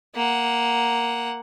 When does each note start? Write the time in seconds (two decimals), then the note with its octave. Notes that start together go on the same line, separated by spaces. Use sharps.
0.15 A#3 F#5